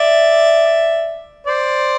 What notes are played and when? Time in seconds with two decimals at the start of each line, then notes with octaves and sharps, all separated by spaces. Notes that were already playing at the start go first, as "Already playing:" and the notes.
Already playing: D5 E5
1.46 C5 D5